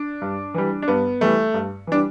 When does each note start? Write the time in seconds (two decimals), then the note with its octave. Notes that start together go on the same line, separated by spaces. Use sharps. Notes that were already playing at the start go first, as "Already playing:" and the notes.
Already playing: D4
0.22 G2
0.54 E3 G3
0.82 D4
0.88 G2 B3
1.21 E3 G3 A3
1.54 G2
1.87 E3 G3 D4